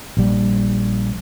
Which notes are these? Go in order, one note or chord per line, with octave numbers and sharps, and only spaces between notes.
A#1 G3